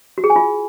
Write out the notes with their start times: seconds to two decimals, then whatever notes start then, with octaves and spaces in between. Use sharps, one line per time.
0.18 F#4
0.24 G#4
0.30 G#5
0.36 F4